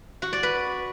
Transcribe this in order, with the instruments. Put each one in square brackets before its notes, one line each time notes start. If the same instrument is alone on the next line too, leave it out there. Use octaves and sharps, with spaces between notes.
[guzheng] F#4
D5
B4